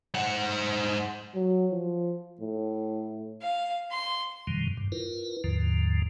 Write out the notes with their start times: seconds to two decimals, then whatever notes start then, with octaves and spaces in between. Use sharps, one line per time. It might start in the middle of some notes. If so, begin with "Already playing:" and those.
0.14 G#2 F#5
1.35 F#3
1.71 F3
2.40 A2
3.42 F5
3.91 C6
4.47 F#2 B2 D#3 F3 G3
4.77 G2
4.92 E4 F4 A#4 B4
5.44 D#2 G#2 D3 F3